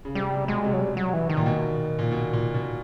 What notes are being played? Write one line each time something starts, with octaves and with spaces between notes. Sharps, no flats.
C#3
C3 G3
C3
B2 G#3
C3
F#3
G3
F#3
E3
D#3
A#2
B2
A#2
B2
A#2
B2